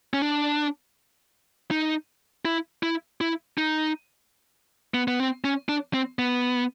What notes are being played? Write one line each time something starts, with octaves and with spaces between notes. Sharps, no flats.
C#4
D4
D#4
E4
E4
E4
D#4
B3
B3
C4
C#4
D4
C4
B3